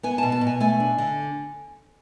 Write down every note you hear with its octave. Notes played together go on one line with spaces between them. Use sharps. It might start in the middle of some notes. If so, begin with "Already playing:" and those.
B3 G#5
B2 A5
A5
B2
G#5
A3 G#5
D4
D3